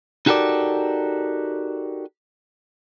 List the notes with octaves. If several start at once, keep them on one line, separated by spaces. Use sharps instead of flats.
D#4 F#4 G4 A4 A#4 D5